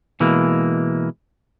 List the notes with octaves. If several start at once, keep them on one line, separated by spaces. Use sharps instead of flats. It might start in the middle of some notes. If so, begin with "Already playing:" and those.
B2 E3 G#3 A#3